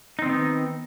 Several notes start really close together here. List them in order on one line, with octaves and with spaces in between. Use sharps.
D#4 C4 D#3 B3